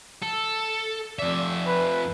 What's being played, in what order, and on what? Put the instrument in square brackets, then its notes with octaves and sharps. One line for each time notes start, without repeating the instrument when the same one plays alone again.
[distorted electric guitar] A4
[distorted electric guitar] F2 E5 [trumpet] D5
[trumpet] B4